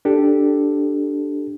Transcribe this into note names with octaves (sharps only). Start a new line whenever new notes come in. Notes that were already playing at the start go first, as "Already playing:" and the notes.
D4 G4 A4